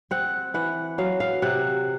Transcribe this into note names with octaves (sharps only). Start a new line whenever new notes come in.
C4 F#5
E3 F#5
F#3 F5
F5
C3 F#5